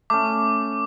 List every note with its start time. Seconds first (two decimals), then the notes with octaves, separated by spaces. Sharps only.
0.10 A3 C#4 D6